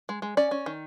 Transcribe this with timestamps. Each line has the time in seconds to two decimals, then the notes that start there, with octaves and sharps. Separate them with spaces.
0.09 G#3
0.22 G#3
0.37 C#4 D5
0.51 C#4
0.66 D#3